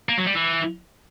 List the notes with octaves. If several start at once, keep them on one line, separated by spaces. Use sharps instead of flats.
A#3
F#3
G3
E3